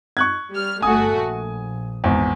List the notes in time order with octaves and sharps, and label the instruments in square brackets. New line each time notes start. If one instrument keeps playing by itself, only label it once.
[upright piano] C#6 F#6 G#6
[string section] G3 F6
[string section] G1 A3 F#4 [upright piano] G#5 D#6
[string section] A#1
[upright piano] G#1 E2